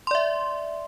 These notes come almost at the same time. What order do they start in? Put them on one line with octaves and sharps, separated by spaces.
C6 D5 E5